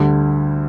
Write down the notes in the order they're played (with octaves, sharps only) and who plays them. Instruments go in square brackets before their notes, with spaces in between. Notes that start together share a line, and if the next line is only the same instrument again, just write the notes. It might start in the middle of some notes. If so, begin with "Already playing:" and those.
Already playing: [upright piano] D2 D3 G3